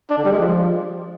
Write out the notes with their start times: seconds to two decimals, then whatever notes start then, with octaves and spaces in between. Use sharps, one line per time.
0.10 D4
0.18 D3
0.25 G3
0.32 G#3
0.40 F3